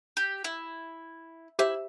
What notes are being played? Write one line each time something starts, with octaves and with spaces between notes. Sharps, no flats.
G4
E4
E4 G4 C5 E5